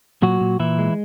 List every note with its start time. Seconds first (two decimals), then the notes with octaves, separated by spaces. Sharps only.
0.22 A#2 F#3 F#4
0.41 A#2
0.59 A#2 E3 E4
0.78 G#3